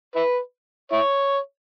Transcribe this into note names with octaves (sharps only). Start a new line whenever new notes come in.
E4 B4
E4 C#5